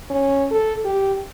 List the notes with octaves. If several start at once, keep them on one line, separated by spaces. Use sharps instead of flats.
C#4
A4
G4